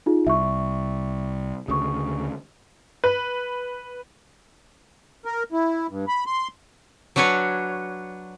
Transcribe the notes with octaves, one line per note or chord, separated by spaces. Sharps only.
D#4 F4 G#4
C2 E5 C#6
D2 C#3 C#6 D#6
B4
A#4
E4
G2
B5
C6
F#3 D4 F#4 B4 C#5